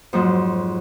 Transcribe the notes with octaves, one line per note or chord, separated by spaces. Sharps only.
F2 G#2 F#3